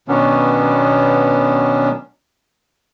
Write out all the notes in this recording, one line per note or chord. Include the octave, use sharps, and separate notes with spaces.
B2 D#3 F#3 B3 C#4 D4